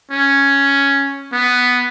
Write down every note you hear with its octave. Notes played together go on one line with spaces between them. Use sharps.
C#4
B3